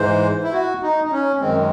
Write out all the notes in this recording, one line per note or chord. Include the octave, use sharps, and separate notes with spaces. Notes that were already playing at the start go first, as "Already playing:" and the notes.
Already playing: G#2 E3 G#3 C5
E4
F#4
D#4
D#4
C#4
F#2 D#3 G#3 C4